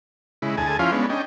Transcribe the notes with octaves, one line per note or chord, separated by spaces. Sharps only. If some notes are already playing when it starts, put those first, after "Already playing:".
C#3 G#3 E4
D2 G#4 G#5 A5
F3 C#4 E4 F4 F5
G#3 B3 C#4 D4
C#4 D4 D#5 G5